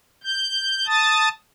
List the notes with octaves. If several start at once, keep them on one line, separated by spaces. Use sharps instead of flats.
G6
A5 D#6 A6